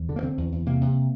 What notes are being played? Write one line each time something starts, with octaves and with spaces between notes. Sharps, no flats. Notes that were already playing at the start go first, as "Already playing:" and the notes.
Already playing: E2
D3
A#3
D3 C4
E2
E2
C3 A#3
C3